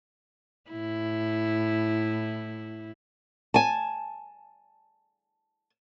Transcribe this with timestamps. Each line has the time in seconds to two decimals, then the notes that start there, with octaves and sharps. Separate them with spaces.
0.70 A2 E4
3.54 G#5 A5